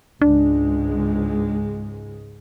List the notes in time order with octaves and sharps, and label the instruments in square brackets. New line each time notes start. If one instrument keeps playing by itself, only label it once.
[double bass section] C#2 G#2 G#3 [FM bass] D4